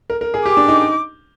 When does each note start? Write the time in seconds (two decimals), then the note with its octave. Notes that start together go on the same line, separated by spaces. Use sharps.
0.10 A#4
0.21 A#4
0.34 G#4
0.46 G4 D6
0.57 D4
0.68 D#4